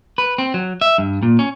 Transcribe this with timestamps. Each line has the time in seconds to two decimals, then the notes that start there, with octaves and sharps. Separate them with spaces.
0.18 B4
0.38 C4
0.54 F#3
0.81 E5
0.98 G2
1.23 A#2
1.39 C#4